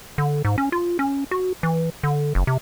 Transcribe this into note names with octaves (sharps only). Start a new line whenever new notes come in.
D3
G#2
C#4
F4
C#4
F#4
E3
D3
F#1
C3